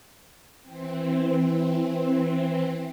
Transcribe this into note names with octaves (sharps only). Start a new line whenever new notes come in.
E3 C4